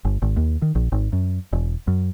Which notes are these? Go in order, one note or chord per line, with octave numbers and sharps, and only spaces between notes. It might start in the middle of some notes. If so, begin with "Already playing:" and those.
G1
G#1
D#2
D#3
A#1
G#1
F#2
E1
F#2